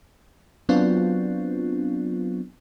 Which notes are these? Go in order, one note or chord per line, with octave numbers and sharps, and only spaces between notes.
F#3 B3 C4 D4 F4